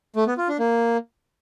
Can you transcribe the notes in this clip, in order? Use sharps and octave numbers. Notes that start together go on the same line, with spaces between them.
A3
B3
F4
D4
A#3